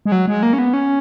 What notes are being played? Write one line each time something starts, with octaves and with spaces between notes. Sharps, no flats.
G#3
F#3
G#3
A#3
C#4
B3
C#4